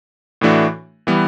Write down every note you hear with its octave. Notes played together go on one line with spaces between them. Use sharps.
A2 E3 A3 D4 F#4
E3 G3 B3